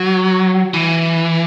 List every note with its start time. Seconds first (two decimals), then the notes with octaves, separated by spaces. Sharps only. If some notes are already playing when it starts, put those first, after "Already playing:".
Already playing: F#3
0.74 E3